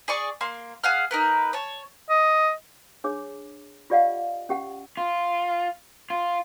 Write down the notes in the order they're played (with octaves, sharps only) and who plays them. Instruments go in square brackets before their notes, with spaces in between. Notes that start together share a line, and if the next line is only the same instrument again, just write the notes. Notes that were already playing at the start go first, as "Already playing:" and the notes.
[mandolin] G#4 D5 C#6
A#3 C6
G#4 F5 F#5 F6
D#4 A#4 B4
C#5 A5
[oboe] D#5
[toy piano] D4 G#4 C#5 D6
F4 G4 D5 D#5 F5 F#5
C#4 G4 F#5
[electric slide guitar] F4
F4